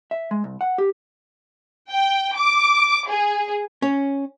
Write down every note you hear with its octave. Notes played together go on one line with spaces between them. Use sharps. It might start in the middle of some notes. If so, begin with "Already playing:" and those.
E5
G#3
C2
F#5
G4
G5
D6
G#4
C#4